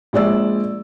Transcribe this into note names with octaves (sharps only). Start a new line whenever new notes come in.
A#1 G#3 D5 E6